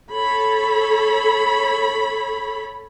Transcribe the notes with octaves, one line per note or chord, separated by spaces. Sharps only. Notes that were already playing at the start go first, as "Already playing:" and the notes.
A4 C#5 B5